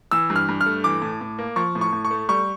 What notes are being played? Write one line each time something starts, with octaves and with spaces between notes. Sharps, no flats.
E3 E6
G2
F6
G2
F6
A3
E3 D6
A2
A2
A#3
F3 C#6
A2
C#6
A2
C#6
A3
G3 C#6